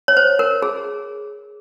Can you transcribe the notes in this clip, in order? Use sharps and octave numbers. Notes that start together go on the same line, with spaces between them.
C#5
C5
A#4
G#4